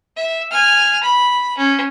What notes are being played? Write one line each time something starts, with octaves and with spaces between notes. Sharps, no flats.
E5
G#5 F6
B5
C#4